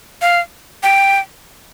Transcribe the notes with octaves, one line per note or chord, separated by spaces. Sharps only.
F5
G5